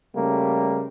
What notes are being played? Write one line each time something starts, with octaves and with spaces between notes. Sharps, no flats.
C#3 G3 A3 A#3